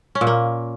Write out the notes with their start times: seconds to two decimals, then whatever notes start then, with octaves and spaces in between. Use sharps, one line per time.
0.15 C#4
0.21 A#2
0.27 A#3